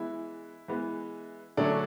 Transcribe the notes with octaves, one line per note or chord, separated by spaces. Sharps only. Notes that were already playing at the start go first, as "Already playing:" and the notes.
Already playing: E3 G#3 B3 E4
E3 G#3 B3
D3 F#3 A3 C#4 D4